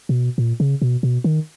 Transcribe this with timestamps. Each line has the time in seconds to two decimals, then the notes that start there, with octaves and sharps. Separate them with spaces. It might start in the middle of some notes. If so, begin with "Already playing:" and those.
0.09 B2
0.38 A#2
0.60 C#3
0.82 B2
1.03 B2
1.24 D#3